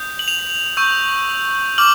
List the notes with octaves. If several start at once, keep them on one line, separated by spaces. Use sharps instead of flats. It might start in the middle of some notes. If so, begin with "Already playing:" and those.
Already playing: D#6 G6
F#7
F7
C#6 E6 G6
D6 F6 F#7